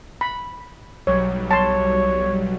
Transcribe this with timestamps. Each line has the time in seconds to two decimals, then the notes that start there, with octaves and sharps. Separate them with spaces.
0.21 B5
1.07 B1 F#3 G3 C#5
1.51 C#5 A5 C6